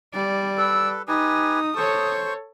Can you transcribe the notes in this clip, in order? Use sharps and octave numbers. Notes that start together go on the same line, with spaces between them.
G3 D5
A4 B4 E6
D#4 G4 B4 G#5 D#6
A4 C5 C#5 C#6